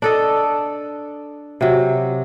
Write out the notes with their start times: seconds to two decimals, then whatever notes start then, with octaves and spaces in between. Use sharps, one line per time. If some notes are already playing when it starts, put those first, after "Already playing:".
0.02 D4 A4 D#5
1.61 C3 F#3